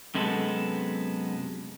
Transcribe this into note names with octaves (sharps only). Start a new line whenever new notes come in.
F#2 C3 G#3 B3 A4